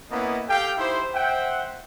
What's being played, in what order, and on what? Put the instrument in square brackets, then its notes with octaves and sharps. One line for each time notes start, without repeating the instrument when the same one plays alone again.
[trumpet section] A#3 B3 C#4 E4 D#5
G4 A4 F5 G5
D#4 E4 G4 C5
C5 E5 F#5 G5